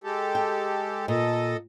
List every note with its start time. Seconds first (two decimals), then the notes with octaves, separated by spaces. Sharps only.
0.04 G#3 G4 A4
0.35 G5
1.08 A#2 A4 D#5